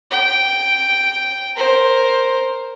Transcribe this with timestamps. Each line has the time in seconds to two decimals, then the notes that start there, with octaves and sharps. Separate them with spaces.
0.11 G5
1.56 A#4 C5